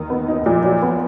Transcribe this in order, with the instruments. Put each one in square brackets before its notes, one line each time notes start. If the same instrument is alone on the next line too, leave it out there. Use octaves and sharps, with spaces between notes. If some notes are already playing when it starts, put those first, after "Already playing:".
Already playing: [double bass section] D#2 D#3
[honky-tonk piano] B3
D#4
[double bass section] F2 F3 [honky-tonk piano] A#2
[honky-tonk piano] F#3
B3